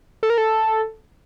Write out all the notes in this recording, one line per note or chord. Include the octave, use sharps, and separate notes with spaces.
A4
A#4
A4